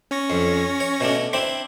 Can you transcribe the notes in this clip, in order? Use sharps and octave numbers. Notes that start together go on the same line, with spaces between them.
C#4 C#6 A#6
F2
C#5
B2 A3 D4
C4 D4 E4